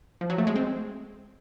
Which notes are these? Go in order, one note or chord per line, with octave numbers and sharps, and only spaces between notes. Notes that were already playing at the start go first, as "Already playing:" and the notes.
F3
F#3
A3
G#3
C4